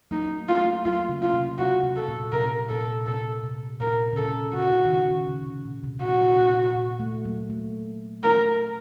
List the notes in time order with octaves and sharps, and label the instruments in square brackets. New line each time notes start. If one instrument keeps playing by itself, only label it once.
[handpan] F#3 A#3 [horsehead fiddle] D#4
[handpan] A3
[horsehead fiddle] F4
[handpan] A3
[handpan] F#3 A#3 [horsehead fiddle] F4
[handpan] C#3
[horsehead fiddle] F4
[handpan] C3
[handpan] C3 [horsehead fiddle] F#4
[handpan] C3
[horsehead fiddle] A4
[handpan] A#2
[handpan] C3 [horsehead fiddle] A#4
[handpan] A#2 [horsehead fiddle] A4
[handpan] C3 [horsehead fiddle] A4
[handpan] C3
[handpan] A#2 [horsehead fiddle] A#4
[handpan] C#3
[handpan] C3 [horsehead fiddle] A4
[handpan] C#3 [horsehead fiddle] F#4
[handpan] C#3
D#3
C#3
D#3
C#3
C3
A#2
C3
[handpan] A#2 [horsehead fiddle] F#4
[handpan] A#2
A#2
A3
F#3 A#3
A3
[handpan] A3 [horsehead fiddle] A#4